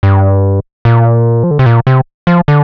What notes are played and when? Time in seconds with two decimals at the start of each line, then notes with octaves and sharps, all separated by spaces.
0.03 G2
0.85 A#2
1.44 F3
1.51 D3
1.59 C3
1.66 A#2
1.87 C3
2.27 F3
2.48 D3